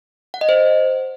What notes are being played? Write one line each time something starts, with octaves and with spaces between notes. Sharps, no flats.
F#5
D#5
C5